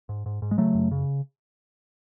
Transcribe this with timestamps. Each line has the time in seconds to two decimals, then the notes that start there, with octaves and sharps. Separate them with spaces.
0.09 G#2
0.26 G#2
0.42 G#2
0.51 G#3
0.58 C#3 F#3 A3
0.74 F#2
0.91 C#3